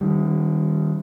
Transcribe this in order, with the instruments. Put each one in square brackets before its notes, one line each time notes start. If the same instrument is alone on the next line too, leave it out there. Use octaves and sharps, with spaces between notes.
[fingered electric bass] D#3 G3